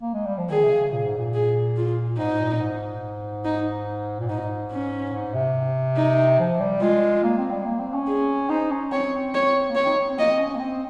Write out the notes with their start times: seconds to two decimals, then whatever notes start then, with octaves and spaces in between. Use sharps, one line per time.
0.02 A#3
0.14 G#3
0.26 G3
0.38 F3
0.50 D#3 G#4
0.63 C3
0.71 C#3
0.92 A#2
1.05 G#2
1.17 A#2
1.34 G#4
1.77 F4
2.18 G#2 D#4
2.39 A#2
2.60 G#2
3.45 D#4
4.20 A#2
4.29 G#2 D#4
4.72 C#4
5.13 G#2
5.34 C3
5.97 D#4
6.39 F3
6.60 G3
6.81 G#3 F4
7.24 A#3
7.37 C4
7.51 G3
7.66 A#3
7.79 C4
7.94 C#4
8.07 G#4
8.49 D#4 C5
8.70 C#4
8.92 C4 C#5
9.35 C#5
9.70 A#3
9.75 C4 C#5
9.86 D#4
10.08 C4
10.18 A#3 D#5
10.29 C4
10.39 C#4
10.50 C#4
10.56 A#3
10.60 C4